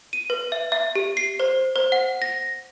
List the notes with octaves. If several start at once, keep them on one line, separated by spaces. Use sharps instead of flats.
D#7
B4
E5
E5
G4
C7
C5
C5
F#5
A#6